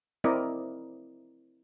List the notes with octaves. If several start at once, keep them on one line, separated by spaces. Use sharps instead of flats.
C4 E4 A#4 D5 D#5